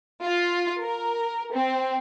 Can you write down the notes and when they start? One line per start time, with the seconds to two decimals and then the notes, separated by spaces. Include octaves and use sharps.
0.23 F4
0.81 A#4
1.55 C4